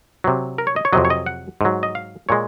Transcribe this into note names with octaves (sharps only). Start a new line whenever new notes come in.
C3 F#3
A#4
C#5
D#5
C#5
F2 C3 F#3 D#5
C#5
D#5
F#5
G#2 F#3
D#5
F5
A#2 G#3 C#5